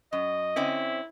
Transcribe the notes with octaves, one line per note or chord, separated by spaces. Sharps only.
F#2 D#5
D3 C4 C#4 E4